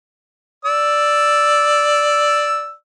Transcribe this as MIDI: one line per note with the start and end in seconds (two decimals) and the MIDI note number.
0.65 2.73 74
0.65 2.73 88